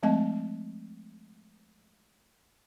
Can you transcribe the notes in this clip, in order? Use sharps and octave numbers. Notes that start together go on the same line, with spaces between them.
F3 G#3 A3 C4 D#5 A5